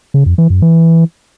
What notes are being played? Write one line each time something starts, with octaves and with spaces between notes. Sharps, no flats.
C#3
F2
E3
F#2
E3